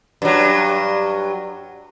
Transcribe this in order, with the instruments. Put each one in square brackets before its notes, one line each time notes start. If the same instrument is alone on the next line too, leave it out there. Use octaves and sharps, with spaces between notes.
[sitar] G2 F#3